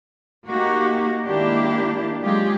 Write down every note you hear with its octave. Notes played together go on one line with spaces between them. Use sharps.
A#3 D#4 F#4 G4
D#3 G#3 A#3 D4 E4 G4
F#3 G#3 F4 G4 G#4